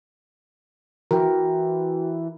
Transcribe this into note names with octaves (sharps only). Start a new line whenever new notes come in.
E3 F#4 A#4 G5